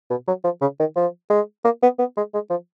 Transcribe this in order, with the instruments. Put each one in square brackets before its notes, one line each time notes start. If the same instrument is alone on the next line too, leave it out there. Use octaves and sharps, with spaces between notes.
[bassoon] B2
F#3
F3
C#3
D#3
F3
G#3
A#3
B3
B3
G#3
G#3
F3